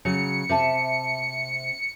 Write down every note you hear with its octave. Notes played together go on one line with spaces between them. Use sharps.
C#3 F#3 C#7
C3 E5 A5